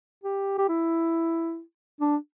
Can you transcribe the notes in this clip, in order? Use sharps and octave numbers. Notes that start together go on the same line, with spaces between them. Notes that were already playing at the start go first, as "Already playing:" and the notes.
G4
G4
E4
D4